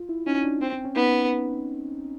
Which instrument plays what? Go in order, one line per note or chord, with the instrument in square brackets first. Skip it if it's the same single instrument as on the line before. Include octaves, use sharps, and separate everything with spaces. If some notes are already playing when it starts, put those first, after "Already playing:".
Already playing: [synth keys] F4
E4
[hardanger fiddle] C#4 [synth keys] D#4
[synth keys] D4
[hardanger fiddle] C4 [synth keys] C#4
[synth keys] C4
C#4
[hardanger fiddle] B3 [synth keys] D#4